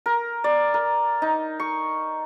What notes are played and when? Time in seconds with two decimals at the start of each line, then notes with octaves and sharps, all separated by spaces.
0.06 A#4
0.44 D5
0.74 A#4
1.22 D#4
1.60 C#6